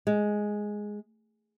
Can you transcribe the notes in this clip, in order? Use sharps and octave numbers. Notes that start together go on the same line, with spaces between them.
G#3